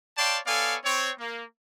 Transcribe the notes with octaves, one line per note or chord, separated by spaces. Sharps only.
C#5 D5 F5 G5 A5 C6
B3 A4 C#5 D5 F5 G#5
C4 C#5
A#3